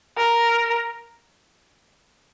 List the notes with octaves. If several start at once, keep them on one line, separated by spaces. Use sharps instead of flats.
A#4